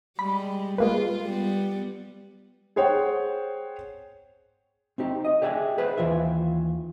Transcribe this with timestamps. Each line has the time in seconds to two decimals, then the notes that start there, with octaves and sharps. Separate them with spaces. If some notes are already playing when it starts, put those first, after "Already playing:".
0.19 G3 G#3 B5
0.78 G#3 A#3 F4 B4
1.22 G3 B3
2.76 G#4 C5 C#5 F#5 G5
4.98 C4 D#4 G4
5.25 D#5
5.42 G4 G#4 D5 E5 G5 G#5
5.78 G#4 B4 C5 E5
5.98 D#2 E3 F4 E5